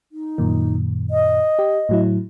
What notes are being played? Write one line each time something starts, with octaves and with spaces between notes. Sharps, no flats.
D#4
F#2 A#2 D#3
D#5
G4
A2 F#3 E4